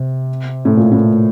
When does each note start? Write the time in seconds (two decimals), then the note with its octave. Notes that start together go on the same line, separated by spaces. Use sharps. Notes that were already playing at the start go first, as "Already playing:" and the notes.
Already playing: C3
0.65 A2
0.77 A#2
0.92 A2